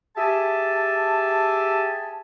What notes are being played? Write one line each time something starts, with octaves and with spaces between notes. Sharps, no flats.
G4 G#4 E5 G#5 A5